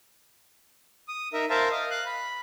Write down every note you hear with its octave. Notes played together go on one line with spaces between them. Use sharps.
D#6
D#4 A#4 E5
A#4 C5 E5 F5 A5
D#5 F5
F5 F#6
B5